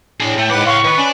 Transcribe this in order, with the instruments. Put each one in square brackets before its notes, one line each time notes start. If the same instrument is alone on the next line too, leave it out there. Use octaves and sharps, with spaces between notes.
[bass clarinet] A2 [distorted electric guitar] D4 G#4
[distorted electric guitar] A3 [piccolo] G5
[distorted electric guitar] C#2 F#5 [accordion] G#2 B4 D6
[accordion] F5 C6 [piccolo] C#6
[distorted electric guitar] D#3 [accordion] B4
[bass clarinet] C#4 [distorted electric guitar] D4